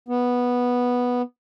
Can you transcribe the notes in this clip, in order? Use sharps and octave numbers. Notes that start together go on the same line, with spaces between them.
B3